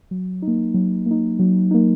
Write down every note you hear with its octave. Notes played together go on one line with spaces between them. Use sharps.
F#3
D#4
A#3
F#3
A#3 D#4
F#3
A#3 D#4